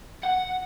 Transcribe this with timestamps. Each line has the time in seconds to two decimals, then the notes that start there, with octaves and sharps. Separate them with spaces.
0.23 F#5